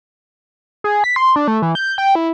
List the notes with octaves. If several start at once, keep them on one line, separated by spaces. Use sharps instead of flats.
G#4
B6
C6
D4
A3
E3
G6
G5
E4